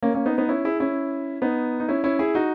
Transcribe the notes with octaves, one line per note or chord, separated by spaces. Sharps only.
A#3 C#4
A#3 C#4
B3 D#4
B3 D#4
C#4 E4
E4 G#4
C#4 E4
B3 D#4
D#4
C#4 E4
C#4 E4
E4 G#4
D#4 F#4